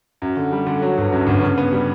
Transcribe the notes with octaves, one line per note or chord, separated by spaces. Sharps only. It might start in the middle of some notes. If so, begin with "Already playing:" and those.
F#2
D3
G3
D3
F#3
G1
F#2
G1
C#3
B3
G3